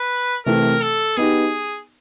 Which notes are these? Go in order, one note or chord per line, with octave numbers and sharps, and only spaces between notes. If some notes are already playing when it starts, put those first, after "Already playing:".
Already playing: B4
C3 E3 A3 C4 A#4
A4
B3 D#4 G4 G#4